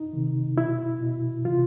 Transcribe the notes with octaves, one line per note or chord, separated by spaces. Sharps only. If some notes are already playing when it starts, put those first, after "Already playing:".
Already playing: D#4
C3 D#3
B2 E4
B2
C3 E3 F4